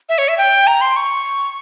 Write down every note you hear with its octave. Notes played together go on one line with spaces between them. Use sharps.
E5
C#5
E5
G5
A#5
C6
C#6